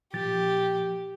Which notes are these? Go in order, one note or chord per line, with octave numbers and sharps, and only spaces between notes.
A#2 F3 G4 A6